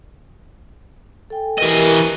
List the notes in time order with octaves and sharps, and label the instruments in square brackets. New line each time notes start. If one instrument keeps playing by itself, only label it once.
[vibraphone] A4 G5 G#5
[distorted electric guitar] E3 D#5 [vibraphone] G4 A#4 B4